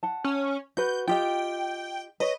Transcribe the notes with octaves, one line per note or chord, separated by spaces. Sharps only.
F#5 A5
C#4
F#4 B4 G6
F4 G4 D#5 G5
B4 C#5 D#5